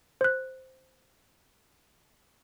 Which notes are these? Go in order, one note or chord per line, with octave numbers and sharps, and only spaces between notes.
C5 F#6